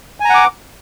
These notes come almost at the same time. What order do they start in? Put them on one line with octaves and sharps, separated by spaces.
G#5 A#5 F#5 D6